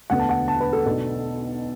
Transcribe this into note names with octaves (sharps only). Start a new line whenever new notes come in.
E1 D2 D3 B3 F#5
A5
F#5
A5
B4
A4
B1 B2 B3 D4 A4